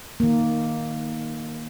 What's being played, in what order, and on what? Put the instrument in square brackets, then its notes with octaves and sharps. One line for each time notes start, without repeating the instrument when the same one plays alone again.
[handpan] D#3 A#3